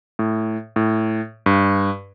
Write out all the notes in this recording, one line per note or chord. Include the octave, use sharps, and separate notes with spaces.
A2
A2
G2